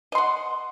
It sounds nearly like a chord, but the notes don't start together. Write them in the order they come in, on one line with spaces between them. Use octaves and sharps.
D#5 C6 F#5